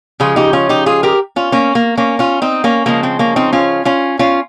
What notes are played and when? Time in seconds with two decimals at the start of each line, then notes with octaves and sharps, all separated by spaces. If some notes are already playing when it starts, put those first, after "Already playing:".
0.20 C#3 F3 G#3 F4 G#4
0.36 D#4 G4
0.53 C#4 F4
0.69 D#4 G4
0.86 F4 G#4
1.03 G4 A#4
1.36 C#4 F4
1.52 A#3 C#4
1.75 A#3
1.97 A#3 C#4
2.19 C#4 F4
2.42 C4 D#4
2.64 A#3 C#4
2.86 C#3 F3 G#3 A#3
3.03 C4
3.19 A#3 C#4
3.36 C4 D#4
3.53 C#4 F4
3.85 C#4 F4
4.19 C#4 F4